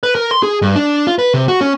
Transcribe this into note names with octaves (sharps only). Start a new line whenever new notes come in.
B4
A#4
C6
G#4
G2
D4
F4
B4
C3
F#4
C#4